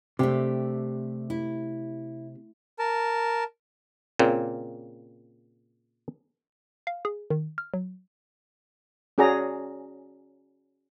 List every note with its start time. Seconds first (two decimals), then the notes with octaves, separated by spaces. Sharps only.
0.19 C3 A3 D4 G4
1.30 E4
2.79 A#4 A5
4.19 A#2 C#3 A#3 C4
6.87 F5
7.05 G#4
7.30 D#3
7.58 F6
7.74 F#3
9.18 C#4 F#4 G#4 D5 A#5